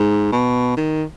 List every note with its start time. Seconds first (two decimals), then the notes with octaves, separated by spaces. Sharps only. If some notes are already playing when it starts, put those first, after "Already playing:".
Already playing: G#2
0.32 B2
0.77 D#3